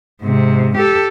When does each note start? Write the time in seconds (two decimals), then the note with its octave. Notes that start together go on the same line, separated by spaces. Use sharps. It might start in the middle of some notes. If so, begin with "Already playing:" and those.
0.22 G#2 C3
0.77 G4 A4